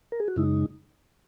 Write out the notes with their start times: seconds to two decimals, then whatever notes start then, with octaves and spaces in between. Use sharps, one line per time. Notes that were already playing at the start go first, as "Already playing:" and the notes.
0.12 A#4
0.20 G#4
0.28 F#4
0.36 F#2 C#3 G#3 D#4 E4